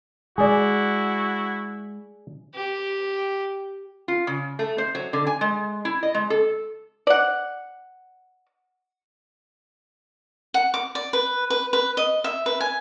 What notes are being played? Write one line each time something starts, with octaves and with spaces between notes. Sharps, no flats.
G#3 E4 F#4 G#4 D5
G4
F4
C#3
A3
C5
F#3
D3
G#5
G#3
E4
D#5
G#3
A4
D5 F#5
F#5
D6
D5
B4
B4
B4
D#5
E5
B4
G#5